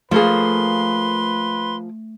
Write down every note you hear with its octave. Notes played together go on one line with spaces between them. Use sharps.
F3 A3 A#3 G#4 A4 B4 C6